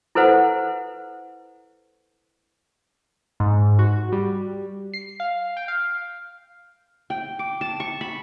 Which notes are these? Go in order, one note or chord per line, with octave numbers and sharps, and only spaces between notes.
E4 A4 B4 C5 F#5
G#2
F#4
G3
C7
F5
G5
F5
G5
D6
A5
C#6
B5